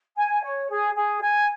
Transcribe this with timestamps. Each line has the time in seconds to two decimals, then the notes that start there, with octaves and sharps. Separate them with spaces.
0.16 G#5
0.43 C#5
0.69 G#4
0.95 G#4
1.22 G#5